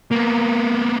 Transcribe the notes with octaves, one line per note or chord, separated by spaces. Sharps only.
A#3 B3